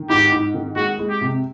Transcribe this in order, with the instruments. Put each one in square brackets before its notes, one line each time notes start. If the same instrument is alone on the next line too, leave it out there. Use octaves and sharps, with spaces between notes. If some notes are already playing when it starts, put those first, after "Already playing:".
Already playing: [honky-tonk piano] D#3
[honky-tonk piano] G#2 [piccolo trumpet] G4
[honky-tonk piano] G#2
D#3
[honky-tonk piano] G#3 [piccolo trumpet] F#4
[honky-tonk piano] G#3
[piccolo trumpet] G4
[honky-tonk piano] C3